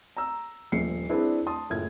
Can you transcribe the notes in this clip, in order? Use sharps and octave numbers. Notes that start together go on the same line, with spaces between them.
A#5 E6
D#1 A#1 F3 C7 C#7
C4 D4 E4 G#4 B4 D5
A5 C6 D#6
F#1 A2 F4 G#6